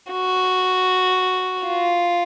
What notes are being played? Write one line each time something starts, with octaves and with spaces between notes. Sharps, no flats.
F#4
F4